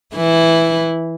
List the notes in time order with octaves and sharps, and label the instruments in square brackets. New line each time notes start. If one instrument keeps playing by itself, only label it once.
[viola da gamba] E3 E4